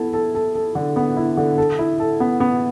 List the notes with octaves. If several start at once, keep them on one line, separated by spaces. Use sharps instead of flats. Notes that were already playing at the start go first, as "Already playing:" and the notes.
Already playing: B3 E4 A4
A4
A4
A4
D3
B3
E4
D3
A4
E4
A4
B3
B3